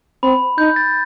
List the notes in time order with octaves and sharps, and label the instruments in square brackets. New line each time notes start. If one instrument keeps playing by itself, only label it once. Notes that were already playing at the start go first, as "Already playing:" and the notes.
[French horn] C4 [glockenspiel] B5
[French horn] D#4 [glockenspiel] G6
[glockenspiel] A6